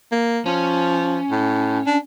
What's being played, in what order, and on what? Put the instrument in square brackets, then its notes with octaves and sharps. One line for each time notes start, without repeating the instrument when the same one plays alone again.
[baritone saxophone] A#3
[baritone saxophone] F3 [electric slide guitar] C#4
[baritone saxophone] A2
D4